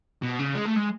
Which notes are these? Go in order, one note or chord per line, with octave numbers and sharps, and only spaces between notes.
B2
C#3
G#3
A3
G#3